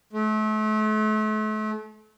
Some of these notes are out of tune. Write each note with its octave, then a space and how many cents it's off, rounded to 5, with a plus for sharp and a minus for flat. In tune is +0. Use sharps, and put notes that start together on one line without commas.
A3 -35